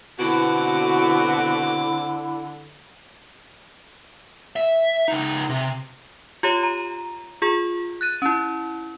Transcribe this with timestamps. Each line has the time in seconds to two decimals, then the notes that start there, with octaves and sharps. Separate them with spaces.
0.19 B2 D3 B3 C4 E4 F#4 D6
4.56 E5
5.08 C#2 D#4
5.49 C3
6.43 F4 G4 C#5
6.63 A#5
7.42 F4 G#4
8.01 F#6 A6 D#7
8.22 C#4 E4